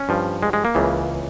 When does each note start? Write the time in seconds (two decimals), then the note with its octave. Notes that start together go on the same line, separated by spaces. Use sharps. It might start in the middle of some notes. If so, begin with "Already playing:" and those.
Already playing: C#4
0.09 G2 F3
0.43 G#3
0.53 G#3
0.65 A#3
0.75 C#2 C#3 E3